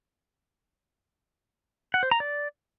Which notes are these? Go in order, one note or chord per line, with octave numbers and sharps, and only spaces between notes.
F#5
C5
A#5
D5